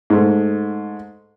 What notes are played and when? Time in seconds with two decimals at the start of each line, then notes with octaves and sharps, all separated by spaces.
0.10 G#2 A3